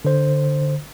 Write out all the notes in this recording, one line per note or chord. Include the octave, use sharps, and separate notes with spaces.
D3 C5